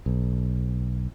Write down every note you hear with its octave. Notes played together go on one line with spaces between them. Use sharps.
B1